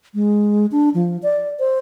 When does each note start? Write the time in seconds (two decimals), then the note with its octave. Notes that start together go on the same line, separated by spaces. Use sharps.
0.14 G#3
0.72 D4
0.94 F3
1.23 D5
1.60 C5